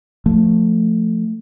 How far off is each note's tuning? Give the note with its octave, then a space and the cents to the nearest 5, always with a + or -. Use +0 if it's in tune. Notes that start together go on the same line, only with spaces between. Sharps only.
F3 +0 A3 +0